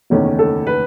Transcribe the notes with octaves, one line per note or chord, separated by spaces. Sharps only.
F#1 E2 D#3 A3 C#4
A4
B4